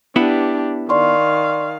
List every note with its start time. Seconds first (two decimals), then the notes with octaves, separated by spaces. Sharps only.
0.16 B3 D4 E4 G4 B4
0.89 D#3 D5 F5 C6 C#6